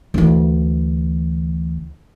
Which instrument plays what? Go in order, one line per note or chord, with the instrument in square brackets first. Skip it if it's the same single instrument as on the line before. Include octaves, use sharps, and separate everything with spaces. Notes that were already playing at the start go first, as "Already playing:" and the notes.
[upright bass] D2 E3